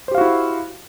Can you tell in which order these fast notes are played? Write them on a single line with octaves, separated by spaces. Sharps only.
C5 G4 F5 F#4 E4